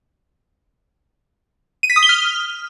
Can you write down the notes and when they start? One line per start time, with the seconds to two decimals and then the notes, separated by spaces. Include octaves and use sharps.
1.83 D#7
1.90 B6
1.96 D#6
2.03 G7
2.09 F6